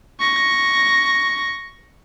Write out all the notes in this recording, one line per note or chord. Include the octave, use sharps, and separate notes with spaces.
C#6 A#6